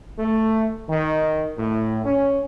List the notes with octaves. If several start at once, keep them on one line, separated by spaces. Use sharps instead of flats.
A3
D#3
A2
C#4